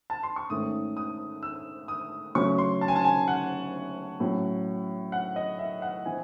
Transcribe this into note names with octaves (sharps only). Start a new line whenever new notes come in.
A5
C6
C#6
G#2 D#3 A3 C#4 D#6
D#6
E6
D#6
C#3 F#3 A3 C#4 C#6
C6
A5
G#5
A5
G#5
F#5
A2 F#3 C#4
F#5
D#5
E5
F#5
E3 C4 G#5